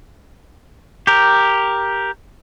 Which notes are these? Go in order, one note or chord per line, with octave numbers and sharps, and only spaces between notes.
G4 A#4